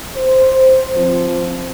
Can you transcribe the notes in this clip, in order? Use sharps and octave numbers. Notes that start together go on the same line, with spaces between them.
C5
F3 C4